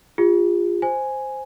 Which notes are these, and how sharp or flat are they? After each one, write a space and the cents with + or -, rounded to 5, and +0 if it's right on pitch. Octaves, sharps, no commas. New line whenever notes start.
F4 +0 G#4 -45
C5 +0 G#5 +0